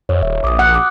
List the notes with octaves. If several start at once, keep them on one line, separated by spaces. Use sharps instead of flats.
F2 C#5
D#1 E5
A#1 D6 D#6
F#5
D6 D#6